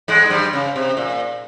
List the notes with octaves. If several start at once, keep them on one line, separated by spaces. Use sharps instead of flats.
G#2 G#3
G#3
G2 G3
C#3
C3
A#2